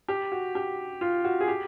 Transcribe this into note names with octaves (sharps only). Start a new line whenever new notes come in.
G4
F#4
G4
F4
F#4
G#4
G4